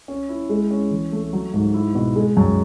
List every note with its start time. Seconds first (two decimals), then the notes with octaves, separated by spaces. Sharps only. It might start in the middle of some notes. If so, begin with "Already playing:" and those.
0.08 C#4
0.29 E4
0.49 G#3
0.71 C#4
0.91 E3
1.12 A3
1.33 F#3
1.54 G#2
1.74 E4
1.95 B2
2.16 G#3
2.37 F#2